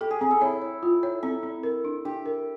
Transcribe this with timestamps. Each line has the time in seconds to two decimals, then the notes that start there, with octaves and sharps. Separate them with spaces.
0.01 G4 A4
0.11 G#4
0.21 C4 G#4
0.31 A4
0.41 E4 C#5
0.62 C#5
0.83 F4
1.03 C#5
1.23 C4 A4
1.43 C4
1.63 A#4
1.85 D4
2.05 D4 G4
2.26 A#4